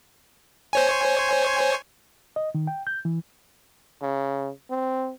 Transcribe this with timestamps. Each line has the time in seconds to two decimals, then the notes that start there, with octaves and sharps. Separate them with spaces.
0.73 C5 C#5 G#5
2.36 D#5
2.55 D#3
2.67 G5
2.87 G6
3.05 E3
4.02 C#3
4.70 C4